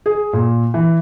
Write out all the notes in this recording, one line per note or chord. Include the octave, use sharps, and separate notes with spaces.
G#4
A#2
E3